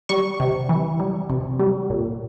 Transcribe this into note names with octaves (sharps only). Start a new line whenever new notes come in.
G3 C#6
C3
E3
G3
C3
G3
A#2